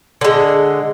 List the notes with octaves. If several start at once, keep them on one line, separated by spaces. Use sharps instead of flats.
D3 G#3